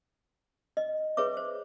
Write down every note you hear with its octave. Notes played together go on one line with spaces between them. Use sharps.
D#5
G#4 B4 C#5 E5 D6
C5